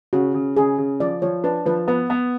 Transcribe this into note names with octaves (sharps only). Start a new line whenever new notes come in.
C#3 F#4
C#3
C#3 G#4
C#3
F3 D5
F3 C#5
D4 B4
F3 B4
B3 B4
B3